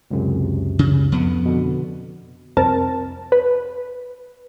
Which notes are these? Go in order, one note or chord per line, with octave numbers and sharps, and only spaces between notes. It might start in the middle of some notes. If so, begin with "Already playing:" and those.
C#2 F#2 C3
C#3
F2 B3
B2 D3
C2 F2 C4 A#4 A5
B4